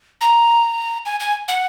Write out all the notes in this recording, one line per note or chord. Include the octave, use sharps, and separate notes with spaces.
A#5
G#5
G#5
F#5